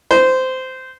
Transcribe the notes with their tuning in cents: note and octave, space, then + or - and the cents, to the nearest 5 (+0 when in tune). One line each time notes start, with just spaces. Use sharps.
C5 -15